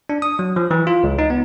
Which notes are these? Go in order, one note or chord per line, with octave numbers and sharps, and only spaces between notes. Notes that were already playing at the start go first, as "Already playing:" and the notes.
D4
D#6
F#3
F3
E3
F4
C#2
D#4
B3